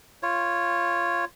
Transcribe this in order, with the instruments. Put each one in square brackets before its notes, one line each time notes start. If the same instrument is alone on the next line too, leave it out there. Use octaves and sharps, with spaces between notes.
[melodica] F4 C#5